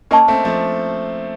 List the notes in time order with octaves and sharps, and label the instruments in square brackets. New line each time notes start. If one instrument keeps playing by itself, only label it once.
[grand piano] A#3 C#4 [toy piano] A#4 D#5 A5 C#6
[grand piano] A3 C4
F3 A3